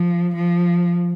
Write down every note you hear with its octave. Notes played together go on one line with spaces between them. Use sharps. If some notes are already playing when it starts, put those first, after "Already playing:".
Already playing: F3
F3